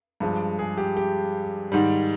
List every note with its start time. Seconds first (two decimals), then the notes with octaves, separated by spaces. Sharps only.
0.20 G2 F3 G#3
0.59 G#4
0.78 G4
0.97 G4
1.72 G#2 D#3 G3